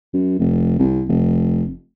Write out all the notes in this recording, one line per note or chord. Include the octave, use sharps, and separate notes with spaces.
F#2
F1
C2
F1